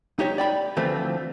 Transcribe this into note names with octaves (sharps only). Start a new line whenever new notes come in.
D#4 G4 C#5
D5 G5 B5
D2 E3 F3 A3 C4